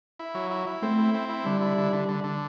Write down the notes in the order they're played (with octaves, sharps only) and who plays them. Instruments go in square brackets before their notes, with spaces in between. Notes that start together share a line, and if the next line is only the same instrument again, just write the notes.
[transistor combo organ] E4
F#3
E4
E4
[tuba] A3 [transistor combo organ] C4
[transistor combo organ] E4
C4
E4
[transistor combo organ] D3 [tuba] G3
[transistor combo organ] E4
D3
D3
D3
D3